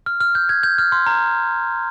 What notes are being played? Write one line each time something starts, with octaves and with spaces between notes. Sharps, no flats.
F6
F6
G6
G#6
G6
F6
C6
A#5